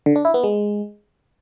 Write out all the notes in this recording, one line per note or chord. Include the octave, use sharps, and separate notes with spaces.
D3
D4
E4
B3
G#3